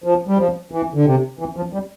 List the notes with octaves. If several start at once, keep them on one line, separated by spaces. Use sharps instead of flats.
F3
G3
F3
E3
D3
C3
E3
F3
G3